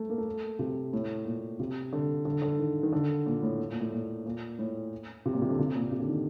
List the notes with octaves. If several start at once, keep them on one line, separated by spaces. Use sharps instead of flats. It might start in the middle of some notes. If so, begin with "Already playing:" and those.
Already playing: A3
A#3
A3
C3
A2
A#2
C3
D3
D3
D3
D#3
D#3
D3
A#2
A2
A#2
A2
A#2
A#2
A2
C3
A#2
C3
D3
C3
A#2
C3
D3
D#3